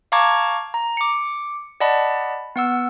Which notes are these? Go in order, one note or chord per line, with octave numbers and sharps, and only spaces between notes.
F5 A5 A#5 C#6 D6 G#6
A#5
D6 C#7
D5 D#5 F#5 A5 B5
B3 F#5 E6